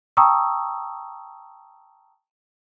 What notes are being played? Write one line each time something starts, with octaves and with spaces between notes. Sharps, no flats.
G5 A5 A#5 C#6 D#6 E6